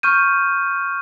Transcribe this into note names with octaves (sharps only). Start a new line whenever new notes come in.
C#6 F6 G6 D#7